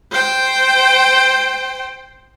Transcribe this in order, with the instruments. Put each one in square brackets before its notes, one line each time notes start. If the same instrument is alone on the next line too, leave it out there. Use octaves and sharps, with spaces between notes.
[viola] C5 G5